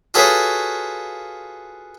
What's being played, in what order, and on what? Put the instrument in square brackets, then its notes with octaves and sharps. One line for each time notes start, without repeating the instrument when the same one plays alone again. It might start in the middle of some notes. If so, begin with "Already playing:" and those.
[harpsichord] F4 F#4 G#4 A4 B4 C#5